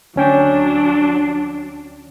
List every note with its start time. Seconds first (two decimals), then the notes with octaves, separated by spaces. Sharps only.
0.16 D2 F#3 C#4 D4 G5